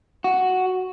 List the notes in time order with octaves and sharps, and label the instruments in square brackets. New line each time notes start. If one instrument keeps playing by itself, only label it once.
[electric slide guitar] F#4